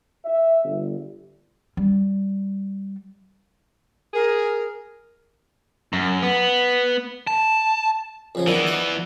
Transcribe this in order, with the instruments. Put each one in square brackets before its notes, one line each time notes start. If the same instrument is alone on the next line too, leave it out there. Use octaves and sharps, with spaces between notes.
[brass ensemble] E5
G1
[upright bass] G3
[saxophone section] G#4 [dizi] A#4
[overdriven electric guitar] F#2
B3
A5
[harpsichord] F2 C#3 F3
[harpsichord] D#3 D4 E4 [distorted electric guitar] E3 B3
[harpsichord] D5 F#5 D6